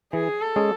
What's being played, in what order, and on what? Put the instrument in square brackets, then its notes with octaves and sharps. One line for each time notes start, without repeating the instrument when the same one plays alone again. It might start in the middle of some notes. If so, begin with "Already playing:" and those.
[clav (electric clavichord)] E3 [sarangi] G#4
[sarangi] A4
[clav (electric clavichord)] G#3 C#4 G#4